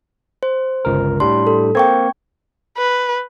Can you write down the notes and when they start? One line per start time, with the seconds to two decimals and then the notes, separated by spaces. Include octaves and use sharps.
0.43 C5
0.85 G1 C#2 A#4
1.20 A2 G3 D4 C6
1.47 A4
1.75 A#3 C4 G5 C#6 G#6
2.77 B4